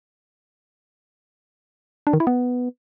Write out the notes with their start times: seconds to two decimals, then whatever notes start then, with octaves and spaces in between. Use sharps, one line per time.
2.07 D4
2.13 D#3
2.20 E4
2.27 B3